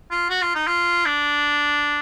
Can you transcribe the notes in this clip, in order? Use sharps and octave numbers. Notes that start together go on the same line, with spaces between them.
F4
F#4
F4
D#4
F4
D4